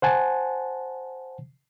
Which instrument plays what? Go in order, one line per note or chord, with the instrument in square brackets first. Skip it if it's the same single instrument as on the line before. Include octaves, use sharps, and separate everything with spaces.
[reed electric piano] C5 F#5 G#5 A5